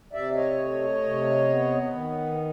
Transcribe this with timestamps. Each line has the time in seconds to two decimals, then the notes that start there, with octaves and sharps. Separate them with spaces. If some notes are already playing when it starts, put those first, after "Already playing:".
0.13 C3 D5 E5
0.35 C#5 D#5
0.58 A3
1.03 C3
1.48 B3
1.93 D#3